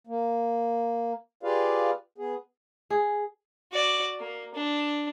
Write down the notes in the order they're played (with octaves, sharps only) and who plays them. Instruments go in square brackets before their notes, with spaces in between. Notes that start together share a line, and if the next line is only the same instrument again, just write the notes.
[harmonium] A#3
F4 G4 G#4 B4 D5 F5
B3 G#4
[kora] G#4
[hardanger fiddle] F#4 D5
A#3
D4